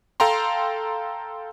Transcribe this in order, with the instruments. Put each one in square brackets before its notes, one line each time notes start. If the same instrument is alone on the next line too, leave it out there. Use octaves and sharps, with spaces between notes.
[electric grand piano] A4 F5 G5 A#5 C6